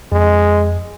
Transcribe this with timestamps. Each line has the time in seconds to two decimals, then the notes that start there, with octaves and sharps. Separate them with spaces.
0.12 F2 G#3